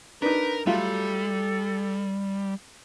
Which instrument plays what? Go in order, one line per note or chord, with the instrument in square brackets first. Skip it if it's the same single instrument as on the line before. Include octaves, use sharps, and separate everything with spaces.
[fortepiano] D4 D#4 [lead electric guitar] A#4 [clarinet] B4
[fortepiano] F#3 A3 F4 [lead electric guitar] G3 [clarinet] A4